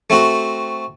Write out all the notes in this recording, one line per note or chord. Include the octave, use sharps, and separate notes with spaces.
A3 C4 F#4